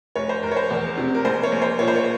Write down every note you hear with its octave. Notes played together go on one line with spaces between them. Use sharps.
F1 C#5
C5
F1 A#4
C#5
C5
E2
C3
A#4
A#1 C5
C#5
A#1
C5
A#2 C#5
C5
C#5